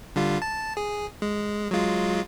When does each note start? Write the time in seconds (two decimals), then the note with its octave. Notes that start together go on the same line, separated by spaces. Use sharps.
0.16 D3 G3 F4
0.42 A5
0.77 G#4
1.22 G#3
1.71 F#3 G#3 F4